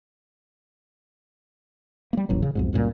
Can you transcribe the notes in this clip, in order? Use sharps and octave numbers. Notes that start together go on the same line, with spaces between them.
G3 A#3
D#1 A1 F#3
C#3
B1 F2 G#2
C#2 F#2 A#2 G3